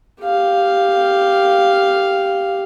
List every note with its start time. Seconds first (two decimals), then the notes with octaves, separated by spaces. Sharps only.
0.22 G4 F5